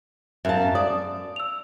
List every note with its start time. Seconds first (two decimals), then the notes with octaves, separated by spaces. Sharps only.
0.45 F#2 E5 F5 A5
0.75 D5 D#6
1.36 E6 F7